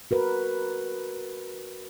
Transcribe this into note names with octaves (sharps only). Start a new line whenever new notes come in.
F#4 A#4 B4